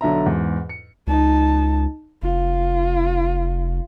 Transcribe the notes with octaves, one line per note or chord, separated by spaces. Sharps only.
B1 D3 E5 A#5
E2 G#2
C#7
C#2 D#4 A5
F1 F4